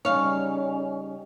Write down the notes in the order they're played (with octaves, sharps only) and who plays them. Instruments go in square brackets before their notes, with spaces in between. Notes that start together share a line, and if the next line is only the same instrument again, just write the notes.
[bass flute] C#3 [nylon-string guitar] G3 C#4 D#4 [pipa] C#5 F5